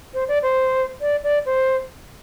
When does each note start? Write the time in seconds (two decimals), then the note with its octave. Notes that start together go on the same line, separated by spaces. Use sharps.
0.14 C5
0.28 D5
0.43 C5
1.01 D5
1.24 D5
1.46 C5